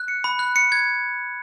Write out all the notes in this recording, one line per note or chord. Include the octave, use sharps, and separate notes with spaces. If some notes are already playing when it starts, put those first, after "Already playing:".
Already playing: F#6
C#7
B5
F#6
C#7
G#6